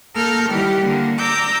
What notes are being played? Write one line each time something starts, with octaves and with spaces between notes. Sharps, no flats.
A#3 A4 A#4 F6 G6
D#3 E3 G3 G4 F#5
D3 A#3
A#5 D6 E6 G6